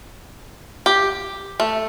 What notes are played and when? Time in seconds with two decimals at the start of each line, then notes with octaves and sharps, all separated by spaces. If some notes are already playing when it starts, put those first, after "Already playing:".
0.86 G4
1.60 A3